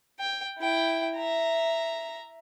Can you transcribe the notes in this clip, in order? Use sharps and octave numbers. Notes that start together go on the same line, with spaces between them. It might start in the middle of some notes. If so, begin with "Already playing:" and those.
G5
E4 G5
E5 A#5